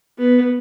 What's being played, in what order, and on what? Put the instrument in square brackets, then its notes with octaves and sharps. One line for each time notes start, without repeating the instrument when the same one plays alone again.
[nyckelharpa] B3